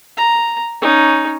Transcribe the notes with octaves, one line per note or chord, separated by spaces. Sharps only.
A#5
C#4 D#4